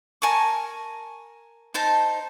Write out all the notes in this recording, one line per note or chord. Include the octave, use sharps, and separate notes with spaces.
A#4 G#5 A5 C#6
D#4 C5 A5